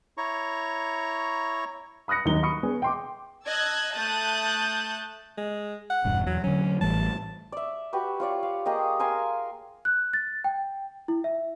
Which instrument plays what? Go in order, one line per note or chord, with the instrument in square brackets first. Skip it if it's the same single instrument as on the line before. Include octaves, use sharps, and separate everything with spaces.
[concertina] E4 C#5 A#5 C#6
[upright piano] B5 D#6 F#6 A#6 C#7
D#2 D#3 F#3 D#4 G7
B5 C#6 D#6 C#7
B3 G#4
G5 C6 D6
[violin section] D#5 A5 E6 F#6 G#6
A3 A5 D#6 F#6 G6 A6
[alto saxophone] G#3
F#5
[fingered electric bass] E1 G2
[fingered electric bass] E2 [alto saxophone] F#3
[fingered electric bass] D3 F#3 [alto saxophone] C#4
[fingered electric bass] A1 E3 G3 [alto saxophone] A5
[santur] D5 E5
F#4 G4 B4
F4 C#5 D5
F5
A#3 G4 G#4 D#5
A#4 F5 G#5 C6
[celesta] F#6
A6
G5
E4
E5